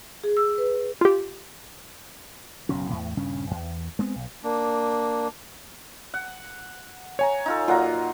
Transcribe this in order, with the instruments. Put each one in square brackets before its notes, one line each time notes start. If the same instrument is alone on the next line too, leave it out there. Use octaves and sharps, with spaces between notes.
[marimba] G#4
E6
B4
[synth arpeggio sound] F4 G4
[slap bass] F#1 B1 F#3 C#4
E2 A2
D#1 G2 C#3 C#4
E2
G#3 B3 C4
B1
[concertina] A#3 D4
[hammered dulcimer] F#5
[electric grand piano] C#5 G#5 A#5
[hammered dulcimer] D#4 F4 A4
[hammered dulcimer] A#2 F#3 [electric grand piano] F4 F#5 A#5